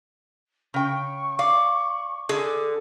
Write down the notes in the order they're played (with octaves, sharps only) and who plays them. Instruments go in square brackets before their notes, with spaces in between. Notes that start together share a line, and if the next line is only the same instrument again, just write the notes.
[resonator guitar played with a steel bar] C#3 G5 [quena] C#6
[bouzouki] D5 [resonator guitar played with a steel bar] F5
[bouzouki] D3 [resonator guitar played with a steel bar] G#4